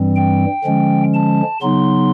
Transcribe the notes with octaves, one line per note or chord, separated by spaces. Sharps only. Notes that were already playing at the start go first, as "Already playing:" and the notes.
Already playing: G2 E3 G3 C4
G5
D3 F3 G#3 C#4
A5
C#3 F#3 B3 D#4 C6